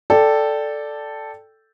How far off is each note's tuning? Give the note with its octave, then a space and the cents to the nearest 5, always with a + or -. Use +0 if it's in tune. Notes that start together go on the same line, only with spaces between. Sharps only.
A4 +0 D5 +0 G5 +0